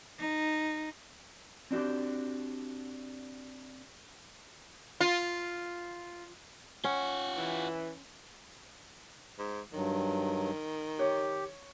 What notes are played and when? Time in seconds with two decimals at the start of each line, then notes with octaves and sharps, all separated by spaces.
0.19 D#4
1.71 C4 D4 F#4 G4
5.01 F4
6.84 C#4 F4 F#5
7.37 E3
9.39 G#2
9.73 G2 D#3 F#3
10.99 G4 C#5